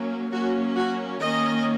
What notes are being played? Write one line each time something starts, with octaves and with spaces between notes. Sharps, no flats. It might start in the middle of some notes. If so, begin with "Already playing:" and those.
Already playing: F#3 A#3 C#4
F#3 A#3 C#4 F#4
F#4
D#3 A#3 C#4 D#5